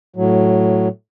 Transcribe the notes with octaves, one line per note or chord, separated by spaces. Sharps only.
A2 F#3